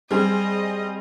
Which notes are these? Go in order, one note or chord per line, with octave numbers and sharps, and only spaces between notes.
G3 C4 G#4 D#5